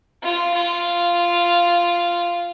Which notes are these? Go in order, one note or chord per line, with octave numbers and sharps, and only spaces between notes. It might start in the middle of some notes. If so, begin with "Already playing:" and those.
F4
F4